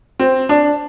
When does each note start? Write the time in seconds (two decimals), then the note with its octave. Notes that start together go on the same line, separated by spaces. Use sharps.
0.19 C4
0.49 D4